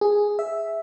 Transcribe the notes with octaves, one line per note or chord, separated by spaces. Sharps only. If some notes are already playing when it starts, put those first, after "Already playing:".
G#4
E5